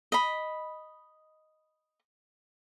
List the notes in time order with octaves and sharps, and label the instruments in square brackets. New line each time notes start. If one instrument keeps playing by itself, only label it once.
[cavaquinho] D#5 B5